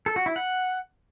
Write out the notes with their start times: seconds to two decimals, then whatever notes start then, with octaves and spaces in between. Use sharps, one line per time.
0.06 A4
0.16 F#4
0.26 E4
0.36 F#5